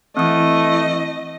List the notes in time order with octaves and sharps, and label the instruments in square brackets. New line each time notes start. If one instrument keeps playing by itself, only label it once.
[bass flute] E3 [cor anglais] A3 [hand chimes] C4 D#6 [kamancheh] D#5